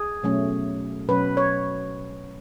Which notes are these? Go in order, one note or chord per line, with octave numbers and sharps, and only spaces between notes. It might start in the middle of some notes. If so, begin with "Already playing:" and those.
Already playing: G#4
B2 F#3 A3 C#4
B2 F#3 C#4 B4
C#5